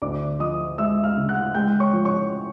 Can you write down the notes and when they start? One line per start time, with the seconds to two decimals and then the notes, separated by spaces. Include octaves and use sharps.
0.02 D2 D5 D6
0.39 F3 D#5 D#6
0.78 G#3 E5 E6
1.04 F5 F6
1.17 C#3
1.29 F#5 F#6
1.54 G#3 G5 G6
1.80 C#5 C#6
1.93 F3
2.05 C#5 C#6